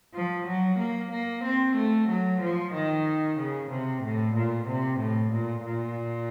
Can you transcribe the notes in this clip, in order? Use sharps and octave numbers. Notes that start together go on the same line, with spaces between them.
F3
F#3
A#3
A#3
C4
A3
F#3
F3
D#3
C#3
C3
A2
A#2
C3
A2
A#2
A#2